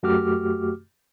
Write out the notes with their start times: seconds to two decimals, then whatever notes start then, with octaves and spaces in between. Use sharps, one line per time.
0.03 F#2 A3 F#4 G4 D6 F6